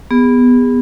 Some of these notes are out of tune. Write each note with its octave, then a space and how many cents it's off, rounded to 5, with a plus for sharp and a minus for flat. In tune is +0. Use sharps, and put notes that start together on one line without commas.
B3 +0 G#4 -35